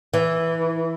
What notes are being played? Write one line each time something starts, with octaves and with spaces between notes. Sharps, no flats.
E3